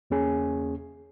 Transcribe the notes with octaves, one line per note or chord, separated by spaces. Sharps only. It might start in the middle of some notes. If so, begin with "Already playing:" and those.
E2 A#3 C#4 G#4 G#5